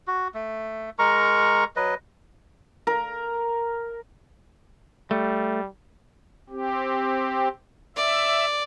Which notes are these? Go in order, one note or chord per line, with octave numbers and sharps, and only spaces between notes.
F#4
A3
G#3 A#4 A#5 C#6
F#3 B4 D#5
A#4
G3 A3
C4 G4
D5 E5